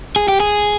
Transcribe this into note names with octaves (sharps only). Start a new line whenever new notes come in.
G#4
G4
G#4